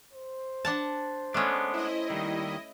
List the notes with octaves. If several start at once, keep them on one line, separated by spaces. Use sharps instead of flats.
C5
D4 F#5 A5
G#3 A3 B3 C#4 D4
E4 D#5
D#2 D#3 G3